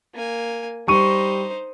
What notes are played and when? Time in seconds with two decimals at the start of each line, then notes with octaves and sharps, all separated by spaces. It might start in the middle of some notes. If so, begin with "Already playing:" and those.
0.14 A#3 G#5
0.88 G3 D#4 C5 C#6 D#7